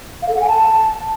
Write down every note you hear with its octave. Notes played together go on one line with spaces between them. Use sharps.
F5
A4
F#5
G#5
A5